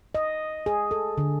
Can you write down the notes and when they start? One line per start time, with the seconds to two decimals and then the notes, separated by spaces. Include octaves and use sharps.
0.15 D#5
0.66 G#4
0.91 A4
1.18 D3